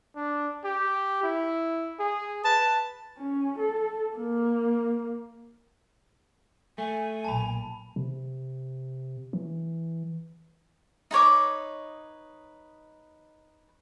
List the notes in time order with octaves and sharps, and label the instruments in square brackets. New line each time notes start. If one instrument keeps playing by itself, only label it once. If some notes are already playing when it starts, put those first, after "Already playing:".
[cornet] D4
G4
E4
G#4
[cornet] B4 [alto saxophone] A5
[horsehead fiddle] C#4
A4
A#3
[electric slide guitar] A3 [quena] G#5
[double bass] B1 A#2 [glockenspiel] A5 B5
[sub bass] C3
E3
[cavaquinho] D#4 B4 C#5 D6